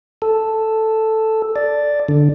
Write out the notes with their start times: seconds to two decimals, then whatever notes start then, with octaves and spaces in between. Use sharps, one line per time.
0.22 A4
1.56 D5
2.08 D3